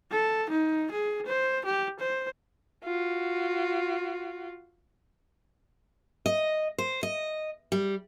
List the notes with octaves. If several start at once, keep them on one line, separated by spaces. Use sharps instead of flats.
A4
D#4
G#4
C5
G4
C5
F4 F#4
D#5
C5
D#5
G3